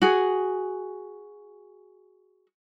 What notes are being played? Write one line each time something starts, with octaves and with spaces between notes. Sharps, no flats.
F#4 G#4